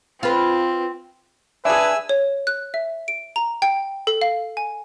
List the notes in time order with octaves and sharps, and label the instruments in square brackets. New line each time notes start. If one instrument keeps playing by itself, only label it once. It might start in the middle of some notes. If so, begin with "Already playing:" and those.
[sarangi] C4 [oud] F4 B4
[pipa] D4 G#4 [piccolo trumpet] B4 [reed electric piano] E5 [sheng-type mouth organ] G#5 E6
[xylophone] C#5
F#6
E5
D7
A#5
G5
A4
F5
G#5